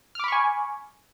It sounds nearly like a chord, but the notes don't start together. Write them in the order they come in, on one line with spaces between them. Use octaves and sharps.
F6 D6 B5 C#6 G#5